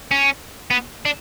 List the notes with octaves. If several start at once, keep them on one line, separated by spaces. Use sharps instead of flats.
C#4
B3
D4